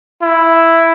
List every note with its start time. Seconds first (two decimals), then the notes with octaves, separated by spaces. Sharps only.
0.22 E4